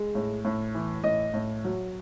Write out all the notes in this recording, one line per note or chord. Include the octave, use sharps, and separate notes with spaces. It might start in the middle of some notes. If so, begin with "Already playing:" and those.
Already playing: G#3
A2
A2
E3
A2 D#5
A2
F#3